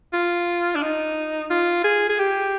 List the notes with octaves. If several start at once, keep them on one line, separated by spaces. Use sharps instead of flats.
F4
D4
D#4
F4
G#4
G#4
G4